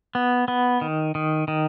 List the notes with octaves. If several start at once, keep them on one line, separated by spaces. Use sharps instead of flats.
B3
B3
D#3
D#3
D#3